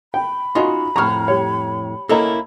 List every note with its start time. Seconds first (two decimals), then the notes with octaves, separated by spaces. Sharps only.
0.14 G5 B5
0.55 C#4 D#4 F4 F#4 D#5 C6
0.96 F2 A2 A#5 C#6 F6
1.28 G3 C#5
2.09 A#3 C#4 E4 A4 D#5 A#5